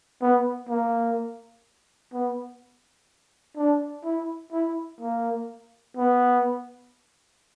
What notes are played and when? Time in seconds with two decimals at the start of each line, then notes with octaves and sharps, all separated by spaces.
0.21 B3
0.69 A#3
2.13 B3
3.57 D4
4.04 E4
4.53 E4
5.01 A#3
5.97 B3